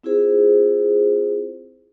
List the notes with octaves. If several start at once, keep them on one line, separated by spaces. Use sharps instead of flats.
C4 E4 F4 G#4 C5